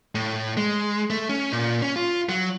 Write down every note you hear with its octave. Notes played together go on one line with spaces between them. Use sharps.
A2
G#3
A3
C#4
A#2
C#4
F4
F#3